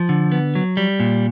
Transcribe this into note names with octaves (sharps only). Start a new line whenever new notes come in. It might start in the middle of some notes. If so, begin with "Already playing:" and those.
Already playing: F3
D3
B3
F#3
G3
A#2